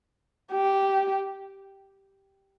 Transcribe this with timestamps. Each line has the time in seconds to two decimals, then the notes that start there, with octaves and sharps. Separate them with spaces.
0.53 G4